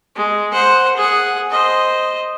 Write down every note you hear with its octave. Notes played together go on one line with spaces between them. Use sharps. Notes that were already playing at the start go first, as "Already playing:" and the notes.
G#3
C5 F#5
G#4 F#5
C5 D#5